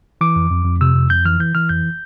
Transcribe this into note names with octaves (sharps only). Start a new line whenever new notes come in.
E3 D6
F2
F2
F2
C3 E6
F2
F2 G6
E3 F6
E3 G6
E3 F6
F2 G6